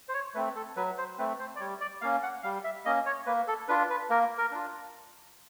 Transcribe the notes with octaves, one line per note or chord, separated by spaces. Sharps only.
C5
C#5
A3 C4 B4
A4
F#3 B4
C5
A3 C4 B4
C5
D5
G3 C#5
D5
A#3 C#4 F5
F#5
G3 F5
E5
A#3 C#4 D#5
C#5
A#3 B4
A4
D4 F4 B4
B4
A#3 A#4
A#4
D4 F4